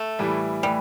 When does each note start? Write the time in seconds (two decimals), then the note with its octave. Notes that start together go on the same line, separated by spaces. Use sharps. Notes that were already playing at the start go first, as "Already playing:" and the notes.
Already playing: A3
0.19 A2 E3 G3 E4
0.63 A2 E3 G3